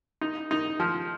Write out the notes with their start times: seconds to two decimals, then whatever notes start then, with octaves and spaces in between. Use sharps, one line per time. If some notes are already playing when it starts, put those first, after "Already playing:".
0.21 D#4
0.51 D#4
0.80 F3